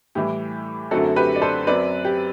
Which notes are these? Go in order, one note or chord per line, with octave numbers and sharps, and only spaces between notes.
A2 E3 G3 G4
F#2 D3 F#3 A3 C4 F#4 A4
G4 B4
D5
A4 C5
F#2 F#3 C4 B4 D5
G4